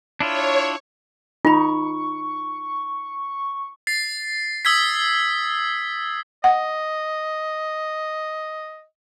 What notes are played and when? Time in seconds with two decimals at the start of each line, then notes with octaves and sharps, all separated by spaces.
0.20 D4 E4 F4 C#5
1.45 D#4 F4 B5 C#6
3.87 A6 C7
4.65 D#6 E6 G#6 B6
6.44 D#5 F#5